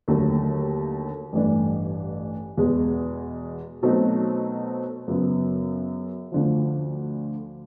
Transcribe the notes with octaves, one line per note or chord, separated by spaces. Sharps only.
D#2 D3 F#3 A3
A1 G2 E3 A3 D4
E2 B2 G#3
B2 F#3 A3 C4 D#4
F#2 C#3 F#3 B3
D2 D3 F3